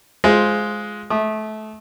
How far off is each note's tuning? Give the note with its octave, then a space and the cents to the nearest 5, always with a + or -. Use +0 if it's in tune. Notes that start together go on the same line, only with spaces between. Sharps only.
G#3 +10 F4 +0 C5 +0
A3 -25 D#6 -20